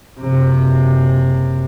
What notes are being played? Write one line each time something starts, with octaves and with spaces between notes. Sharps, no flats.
F#1 C3